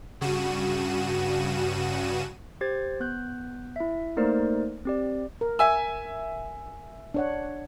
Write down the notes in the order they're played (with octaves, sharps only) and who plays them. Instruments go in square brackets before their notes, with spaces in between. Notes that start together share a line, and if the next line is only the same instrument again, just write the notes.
[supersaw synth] G2 C#3 F#4 D#7 E7
[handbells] G4 C5 G#6 A6
B3 F#6 G6
E4 E5
A3 A#3 D#4 A#4 C5 D5
C4 G4 D5
[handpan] A#4
[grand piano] E5 G#5 E6
[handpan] D4 C#5 F#5